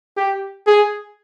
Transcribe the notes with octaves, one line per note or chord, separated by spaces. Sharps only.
G4
G#4